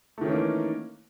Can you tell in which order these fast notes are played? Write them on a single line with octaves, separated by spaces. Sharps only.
A3 D#3 C#4 E3 A#3